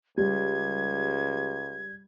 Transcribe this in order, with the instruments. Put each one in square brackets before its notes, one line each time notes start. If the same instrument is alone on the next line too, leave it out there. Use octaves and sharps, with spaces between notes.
[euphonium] C#2 [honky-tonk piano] G3 [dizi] G#6